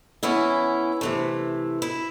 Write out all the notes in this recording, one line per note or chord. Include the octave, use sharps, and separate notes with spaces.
E3 B3 C#4 E4
C3 E3 A3
E4